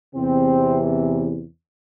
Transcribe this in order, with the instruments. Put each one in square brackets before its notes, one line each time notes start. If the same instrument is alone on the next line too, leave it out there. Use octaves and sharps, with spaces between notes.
[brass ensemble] E2 C3 E3 C4